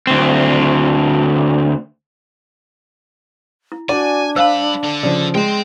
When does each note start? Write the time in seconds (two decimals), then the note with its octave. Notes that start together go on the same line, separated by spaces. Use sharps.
0.07 D2 C4
3.72 E4
3.89 D4 F#4 D5 G#5
4.36 G2 C5 F5 A5 B5 E6
4.84 D3
5.03 C#3 F3 D5
5.35 G#3 G5 C6